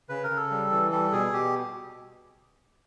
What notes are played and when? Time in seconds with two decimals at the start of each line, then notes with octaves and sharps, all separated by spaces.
0.09 C#3 B4
0.24 A#4
0.30 C#3
0.36 A4
0.51 G3
0.71 E3
0.91 G3 A4
1.12 B2 G#4
1.32 B2 G4